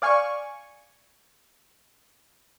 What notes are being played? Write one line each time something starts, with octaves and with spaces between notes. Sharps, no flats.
D5 F5 G#5 C#6